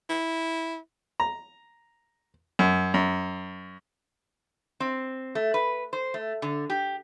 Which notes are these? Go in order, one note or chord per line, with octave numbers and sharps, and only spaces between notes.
E4
A#5
F#2
F#2
C4
A3
B4
C5
A3
D3
G4